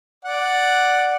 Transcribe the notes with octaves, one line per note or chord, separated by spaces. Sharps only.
D5 F#5